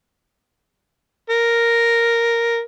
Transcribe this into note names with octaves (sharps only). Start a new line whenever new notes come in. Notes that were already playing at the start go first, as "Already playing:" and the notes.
A#4